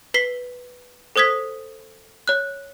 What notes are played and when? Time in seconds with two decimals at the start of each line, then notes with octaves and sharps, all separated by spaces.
0.14 B4 B6 C7 G7
1.16 A4 C5 D#6 G#6 B6
2.28 C#5 F#6